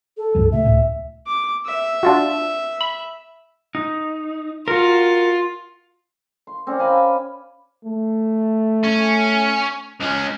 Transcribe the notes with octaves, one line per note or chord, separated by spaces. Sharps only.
A4
C#2 G2 G3
C3 A3 E5
C#2 A2
D6
E5
D4 F4 F#4
B5
D#4
F4 F#4 A#4
C6
C4 C#4 D5
F5 G#5 A#5 B5
A3
C#4
C#2 C#4